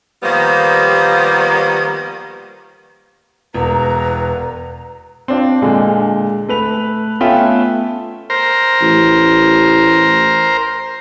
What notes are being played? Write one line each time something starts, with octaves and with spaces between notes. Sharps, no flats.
D#3 F3 G3 A#3 B3
E1 B4 A#5
C4 D4 F4
A#2 D3 G#3
A3 B4 F7
A3 B3 C#4 F4 E5 G5
A#4 C5
A1